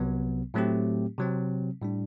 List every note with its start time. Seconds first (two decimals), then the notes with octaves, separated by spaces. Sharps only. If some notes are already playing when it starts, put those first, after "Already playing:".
Already playing: C2 C3 F#3 B3
0.54 A2 F#3 A3 C4 G4
1.18 C3 F#3 C4
1.82 A2 G3 D4